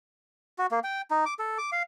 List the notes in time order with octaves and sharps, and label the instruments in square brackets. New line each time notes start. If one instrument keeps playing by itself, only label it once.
[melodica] F#4
A#3
G5
D#4
D6
A4
D6
F5